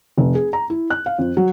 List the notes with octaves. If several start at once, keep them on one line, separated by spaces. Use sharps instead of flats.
F1
G#4
A#5
E4
F#6
F5
F2
F#3